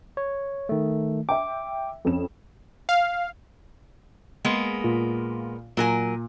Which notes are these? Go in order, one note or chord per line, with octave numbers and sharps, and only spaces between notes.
C#5
D#3 A3
E5 G5 D6
F2 C#4 E7
F5
G#3 A#3 B3
A#2 F4
A#2 F#3 A#4 G#5